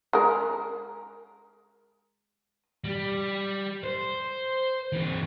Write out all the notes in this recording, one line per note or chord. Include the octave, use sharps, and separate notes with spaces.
G#3 A#4
G3
C5
E3 C4